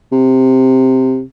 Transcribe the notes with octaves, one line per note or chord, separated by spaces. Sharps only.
C3